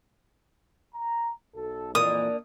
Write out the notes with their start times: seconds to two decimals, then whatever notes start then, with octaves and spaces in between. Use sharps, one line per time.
0.95 A#5
1.55 B1 A4
1.95 F2 A#2 E3 A#3 D4 D#6